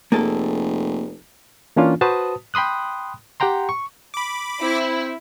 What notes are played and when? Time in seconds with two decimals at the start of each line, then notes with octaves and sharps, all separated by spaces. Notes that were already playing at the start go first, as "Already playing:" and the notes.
0.12 F1 A#3 G#4 A4
1.76 E3 A#3 C#4 D4 F4
2.01 F#4 B4 C5 A5 D#6
2.54 G5 B5 C6 D#6 F#6
3.40 G4 F#5 G5 A#5 C6
3.69 C#6
4.14 B5 D6
4.61 C4 E4